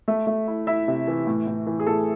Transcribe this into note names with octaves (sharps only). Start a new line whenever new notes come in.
A3 E5
A3
E4
E4 E5
C3
E3
A2
A2
E3
G#4
A2 A4